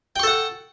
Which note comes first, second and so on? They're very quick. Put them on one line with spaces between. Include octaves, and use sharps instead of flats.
G5 C#6 A4 F#5